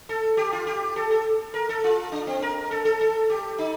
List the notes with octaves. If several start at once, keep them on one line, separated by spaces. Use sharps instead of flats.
A4
G4
F4
G4
A4
A4
A#4
A4
F4
D4
C4
A#4
A4
A4
A4
G4
D#4